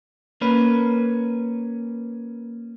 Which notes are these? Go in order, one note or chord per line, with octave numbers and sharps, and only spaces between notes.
A#3 C#4 B4